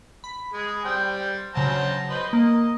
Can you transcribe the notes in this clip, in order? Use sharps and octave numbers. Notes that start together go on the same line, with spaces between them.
B5
G#3 G#4
G3 C5 G5
C#3 F#3 C5 A5 A#5
B4 C5 D#5
A#3 D#5